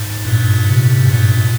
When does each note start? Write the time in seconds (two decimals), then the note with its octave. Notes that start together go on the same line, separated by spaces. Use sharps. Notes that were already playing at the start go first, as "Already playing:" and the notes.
Already playing: G#2
0.25 G2 A#2
0.66 G#2 C3
1.07 G2 A#2